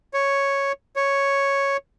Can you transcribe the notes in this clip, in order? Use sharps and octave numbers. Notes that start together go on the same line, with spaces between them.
C#5
C#5